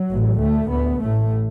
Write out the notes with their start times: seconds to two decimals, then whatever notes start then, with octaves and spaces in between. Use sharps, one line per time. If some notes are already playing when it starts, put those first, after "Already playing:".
Already playing: F#3
0.10 A1 A2
0.40 D2 A3
0.71 D2 B3
1.01 A1 A2 A3